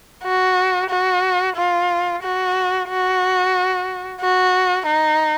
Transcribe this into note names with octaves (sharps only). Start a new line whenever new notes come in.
F#4
F#4
F4
F#4
F#4
F#4
D#4